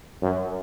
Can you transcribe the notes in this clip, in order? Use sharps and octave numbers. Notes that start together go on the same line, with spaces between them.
F#2